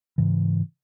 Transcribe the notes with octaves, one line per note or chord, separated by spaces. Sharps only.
G#2 C#3 E3